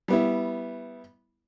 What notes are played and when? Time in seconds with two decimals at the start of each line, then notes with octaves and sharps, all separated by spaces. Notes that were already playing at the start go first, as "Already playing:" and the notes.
0.08 G3 B3 E4